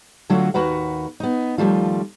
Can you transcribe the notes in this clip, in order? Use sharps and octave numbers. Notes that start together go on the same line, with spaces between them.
D3 F#3 A3 F4 F#4
D#2 F#4 A#4 B4 F#5
B3 D#4
D#2 A2 F3 G3 A3 F4